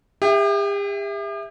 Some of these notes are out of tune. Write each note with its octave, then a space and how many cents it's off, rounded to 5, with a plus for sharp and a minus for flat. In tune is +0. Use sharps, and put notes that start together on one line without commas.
G4 +45 E5 +0 G5 -5